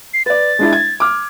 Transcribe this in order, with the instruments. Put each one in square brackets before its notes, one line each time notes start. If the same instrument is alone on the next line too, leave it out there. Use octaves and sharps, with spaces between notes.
[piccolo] C7
[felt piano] B4 D5 [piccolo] A6
[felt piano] G#3 D4 E4
G#6
D6 F6